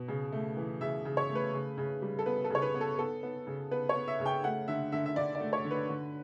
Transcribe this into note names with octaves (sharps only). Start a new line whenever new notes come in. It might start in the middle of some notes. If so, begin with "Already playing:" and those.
Already playing: B2
C#3
A3
E3
C#3 E5
C#3
C#5
A3
B4
C#3
C#3
G3
A4
B3 B4
A4
C#3 C#5
B4
B3
A4
B3 A4
B3
C#3
B3 B4
C#5
B3
E5
C#3
G5
A3 F#5
D3 E5
D3 E5
E5
D3 D5
D5
A3
C#5
D3
B4
D3